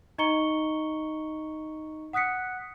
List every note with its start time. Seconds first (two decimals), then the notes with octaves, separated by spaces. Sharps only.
0.18 D#4 D#5 A#5 C#6 C#7 G7
2.13 F#5 D#6 F#6 B6 C#7